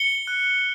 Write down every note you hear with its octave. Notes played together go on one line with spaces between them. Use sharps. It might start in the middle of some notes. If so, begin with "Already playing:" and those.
Already playing: C#7 G7
F#6